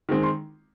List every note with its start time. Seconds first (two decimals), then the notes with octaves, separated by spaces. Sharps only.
0.09 D#3 G#3 C4
0.23 C6